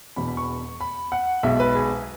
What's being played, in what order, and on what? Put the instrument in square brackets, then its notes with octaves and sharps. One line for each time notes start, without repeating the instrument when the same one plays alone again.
[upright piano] E1 E2 B2 B5
B5
C#6
B5
F#5
B1 B2 G#3 E5
B4
G#4